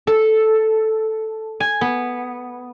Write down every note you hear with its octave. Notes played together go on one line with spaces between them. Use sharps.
A4
G#5
B3